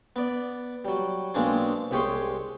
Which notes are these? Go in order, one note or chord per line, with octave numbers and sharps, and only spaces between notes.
B3 D5
F#3 G3
B1 G#3 A#3 C4 D4 G#4
C2 G#3 G4 G#4 C#5 C6